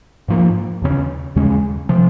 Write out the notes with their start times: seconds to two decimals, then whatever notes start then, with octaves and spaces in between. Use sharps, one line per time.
0.28 G#2 F3 A#3
0.82 D#2 C#3 G#3 C#4
1.36 D#2 C#3 G#3 C#4
1.89 C3 F3